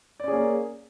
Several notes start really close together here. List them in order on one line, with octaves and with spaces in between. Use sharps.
D5 C#4 G#4 A#3